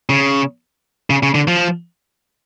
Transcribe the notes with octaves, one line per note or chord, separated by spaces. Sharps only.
C#3
C#3
C#3
D3
F3